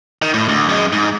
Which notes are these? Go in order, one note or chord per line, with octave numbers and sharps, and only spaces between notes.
D#3
A2
D2
F#2 G#3
G#2